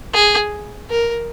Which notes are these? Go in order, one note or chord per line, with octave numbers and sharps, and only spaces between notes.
G#4
A#4